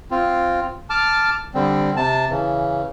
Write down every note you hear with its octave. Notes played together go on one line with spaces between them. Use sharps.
C4 F4
A5 D6 F6
D3 G3 C4
C3 A5
C#3 E3